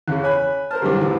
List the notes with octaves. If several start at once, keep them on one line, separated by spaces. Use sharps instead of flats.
E2 C#3 E3 G#4 F#6
C#5 G#5 B5 F#6
A#4 C5 A5 F6
C2 F#2 D3 G4 G#4 D6
E2 A2 E3